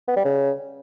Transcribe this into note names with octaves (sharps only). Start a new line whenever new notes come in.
B3
G3
C#3